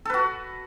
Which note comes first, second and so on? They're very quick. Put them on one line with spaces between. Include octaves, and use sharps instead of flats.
A4 B4 F#4